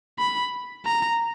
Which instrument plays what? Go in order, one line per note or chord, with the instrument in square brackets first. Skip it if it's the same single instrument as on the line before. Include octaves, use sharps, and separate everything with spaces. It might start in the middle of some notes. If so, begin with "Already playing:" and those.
[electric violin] B5
A#5